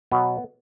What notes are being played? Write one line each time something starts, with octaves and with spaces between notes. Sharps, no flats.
B2 F#3 B3